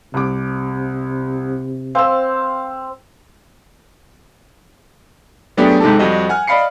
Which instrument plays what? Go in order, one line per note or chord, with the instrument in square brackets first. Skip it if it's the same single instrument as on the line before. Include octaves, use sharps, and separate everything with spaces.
[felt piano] C2 D6 [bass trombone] C3
[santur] C4 [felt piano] F5 E6
[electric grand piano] F#3 A3 B3 D4 G4 G#4
G#2 C3 D#4 G4 A4 A5
F2 G3 F#4 D#5
F#5 G#5 F6
D5 D#5 F5 B5 C7 C#7